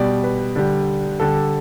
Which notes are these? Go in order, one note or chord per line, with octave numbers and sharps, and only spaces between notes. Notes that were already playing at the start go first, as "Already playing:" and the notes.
Already playing: B2 G3 D5
B4
D3 G3
D3 G3 A4